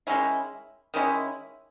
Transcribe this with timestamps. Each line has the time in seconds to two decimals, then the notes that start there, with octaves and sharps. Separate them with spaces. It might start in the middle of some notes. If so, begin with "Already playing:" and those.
0.07 D#3 G#3 C#4 E4
0.94 D#3 G#3 C#4 E4